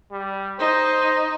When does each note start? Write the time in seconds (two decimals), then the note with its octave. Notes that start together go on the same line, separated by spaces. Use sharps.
0.11 G3
0.59 D#4 C5